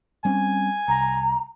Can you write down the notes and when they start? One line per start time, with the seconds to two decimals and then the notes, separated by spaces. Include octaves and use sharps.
0.25 G3 C4 C#4 G#5
0.88 C2 A#5